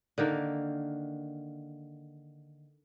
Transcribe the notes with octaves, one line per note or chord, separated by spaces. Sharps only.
D3 D#3 A#3